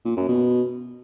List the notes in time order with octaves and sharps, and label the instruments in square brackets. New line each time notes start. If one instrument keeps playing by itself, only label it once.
[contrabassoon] A#2
F#2
B2